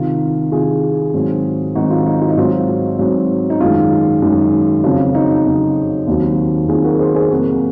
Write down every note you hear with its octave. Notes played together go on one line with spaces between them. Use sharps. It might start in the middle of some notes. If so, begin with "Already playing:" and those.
Already playing: C2 C3 D#3 F4
C2 C3 D#3 F4 G#4
G#2 D#3 F#3 C4
G#2 D#3 F#3 C4 D#4 F#4
F4
D#4
F4
D#4
G#2 F#3 C4 F4
G#2 F#3 C4
D#4
F#2 D#3 G#3 F4
F#2 D#3 G#3
F2 C#3 F#3 F4
D#4
F2 C#3 F#3
D#2 D#3 F#3 C4
D#2 D#3 F#3 C4 F4 G#4
F#4 A#4
G#4 C5
G#4 C5
F2 C3 F#3 A#3 F#4 A#4